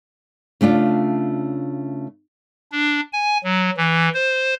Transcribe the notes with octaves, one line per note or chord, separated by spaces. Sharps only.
C#3 A3 D4 F4
D4
G#5
F#3
E3
C5